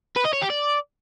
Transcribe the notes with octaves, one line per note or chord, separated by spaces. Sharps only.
B4
D#5
C#5
G4
D5